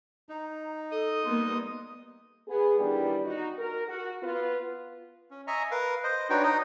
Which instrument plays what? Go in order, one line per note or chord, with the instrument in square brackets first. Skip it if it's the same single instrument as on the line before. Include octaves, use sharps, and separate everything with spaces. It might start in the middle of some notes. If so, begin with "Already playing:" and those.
[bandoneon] D#4 [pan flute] A#5
[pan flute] A4 [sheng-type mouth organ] D#5 D#6
[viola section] G3 A#3 B3 [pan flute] C6
[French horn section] B3 G#4
D#3 E3 G3 B3 D4 G4
D#4 F#4
A#4
F#4
B3 F4 B4
[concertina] C#4
D#5 E5 G#5 A#5 C#6
A#4 B4 F5
C5 D#5
D4 D#4 F#4 B4 C#5 G5
D#4 D#5